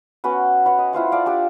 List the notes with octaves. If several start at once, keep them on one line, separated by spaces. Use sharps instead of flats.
B3 C#4 F#4 B4
B4 C#5 F#5
D#5
E4 F4 C5 F#5
A4 D5 F5
D4 G4 A4